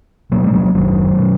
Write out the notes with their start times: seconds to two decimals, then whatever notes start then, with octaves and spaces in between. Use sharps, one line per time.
0.32 B2 F#3 A#3
0.44 G#3
0.53 F#3 A#3
0.74 F#1 D#3 F#3
1.18 B2